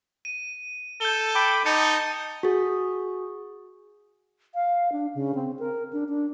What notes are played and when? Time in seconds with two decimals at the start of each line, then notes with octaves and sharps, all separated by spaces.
0.25 D#7
1.01 A4 G6 G7
1.35 G5 B5 D6
1.66 D#4 A5 G6 C#7
2.43 F#4 G#4
4.55 F5
4.92 D4
5.15 C#3
5.35 C4
5.59 A#4
5.93 D4
6.09 D4